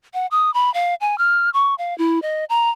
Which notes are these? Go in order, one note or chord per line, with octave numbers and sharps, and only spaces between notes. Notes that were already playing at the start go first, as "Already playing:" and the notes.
F#5
D#6
B5
F5
G#5
F6
C#6
F5
E4
D#5
A#5